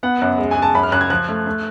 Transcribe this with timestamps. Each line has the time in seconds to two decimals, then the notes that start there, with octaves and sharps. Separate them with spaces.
0.03 B3 F#5
0.22 F#2
0.38 G#3
0.51 G#5
0.56 G#3
0.62 A5
0.75 F#2 B5
0.83 F6
0.92 F#2 F#6
1.01 G#6
1.10 F3 F#6
1.28 A3
1.47 A3